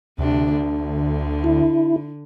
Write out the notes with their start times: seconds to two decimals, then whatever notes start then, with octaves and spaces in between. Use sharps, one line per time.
0.18 D2 C3 D4
0.53 D3
1.44 E4